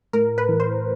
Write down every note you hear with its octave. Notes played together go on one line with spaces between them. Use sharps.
A2 A#4
B4
E3
C5